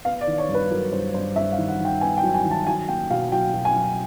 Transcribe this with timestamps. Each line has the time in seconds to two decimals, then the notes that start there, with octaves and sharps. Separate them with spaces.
0.05 B3 F5
0.21 D5
0.27 D#3
0.38 C#5
0.49 G2
0.54 B4
0.71 F#3 A#4
0.92 G2 C5
1.14 G2 C5
1.36 G2 E5
1.52 F5
1.58 D#3
1.69 F#5
1.80 D#3
1.85 G5
2.01 B3 G#5
2.18 G5
2.23 F#3
2.34 G#5
2.45 D#3
2.51 A5
2.67 F#3 G#5
2.88 A#3 G5
3.10 B2 F5
3.32 F#3 G5
3.54 B2
3.65 G#5
3.76 F#3